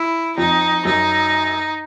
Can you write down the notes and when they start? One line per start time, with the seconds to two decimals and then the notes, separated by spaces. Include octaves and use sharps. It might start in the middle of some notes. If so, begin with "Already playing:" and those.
Already playing: E4
0.37 F2 F3 D#4
0.85 F#2 F#3 D#4